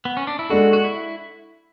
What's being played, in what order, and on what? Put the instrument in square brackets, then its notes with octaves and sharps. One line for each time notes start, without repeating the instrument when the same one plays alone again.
[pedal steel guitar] B3
C#4
D4
E4
[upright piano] G#3 D4 A4 [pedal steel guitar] F#4
[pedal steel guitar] F#4
E4